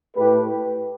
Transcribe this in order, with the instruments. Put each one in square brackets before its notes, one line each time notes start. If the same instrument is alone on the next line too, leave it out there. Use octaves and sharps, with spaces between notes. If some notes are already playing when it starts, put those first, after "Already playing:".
[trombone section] A2 A3 G4 B4